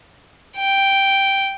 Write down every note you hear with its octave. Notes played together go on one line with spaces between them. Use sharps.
G5